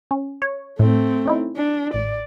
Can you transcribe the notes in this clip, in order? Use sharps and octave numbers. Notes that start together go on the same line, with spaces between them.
C#4
C#5
A2 A3 C4
C#4 D#4 E4
D4
A1 D5